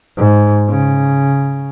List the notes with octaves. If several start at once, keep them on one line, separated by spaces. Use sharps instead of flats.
G#2
C#3